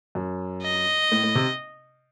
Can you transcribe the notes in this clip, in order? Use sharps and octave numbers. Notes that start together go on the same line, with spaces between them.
F#2
D#5
A2
A2
C3